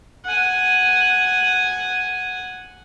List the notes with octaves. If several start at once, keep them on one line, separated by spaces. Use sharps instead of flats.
F#5 G#5